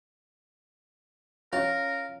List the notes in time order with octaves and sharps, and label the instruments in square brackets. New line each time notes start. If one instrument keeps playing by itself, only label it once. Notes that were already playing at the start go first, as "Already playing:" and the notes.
[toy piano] C#4 E4 C#5 [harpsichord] F4 [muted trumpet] A#4